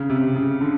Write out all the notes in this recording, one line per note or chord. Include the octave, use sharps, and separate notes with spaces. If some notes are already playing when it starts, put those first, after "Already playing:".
Already playing: C#3
C3
C#3
D3